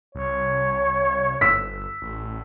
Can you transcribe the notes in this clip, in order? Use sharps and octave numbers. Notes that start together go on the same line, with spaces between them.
C2 C#5
G1 E6 B6
A1